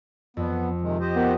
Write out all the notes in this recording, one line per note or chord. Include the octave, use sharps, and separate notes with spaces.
F2 B3
C3 D#3 G#3
G4 C5 D#5
D#3 B3